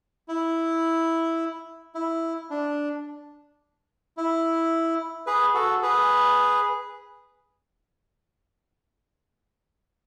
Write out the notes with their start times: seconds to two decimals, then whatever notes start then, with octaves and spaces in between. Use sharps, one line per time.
0.28 E4
1.95 E4
2.50 D4
4.17 E4
5.27 G#4 B4
5.54 F#4 A4
5.82 G#4 B4